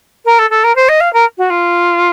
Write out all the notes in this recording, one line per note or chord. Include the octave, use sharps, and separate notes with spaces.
A#4
A4
A4
A#4
C5
D#5
F5
A#4
F#4
F4